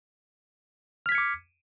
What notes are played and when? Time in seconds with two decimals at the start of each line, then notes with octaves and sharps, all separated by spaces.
1.06 F6
1.09 B6
1.12 G#6
1.15 C#7
1.18 D6